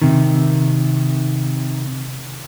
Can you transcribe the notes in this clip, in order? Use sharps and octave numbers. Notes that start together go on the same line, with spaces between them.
C3 D#3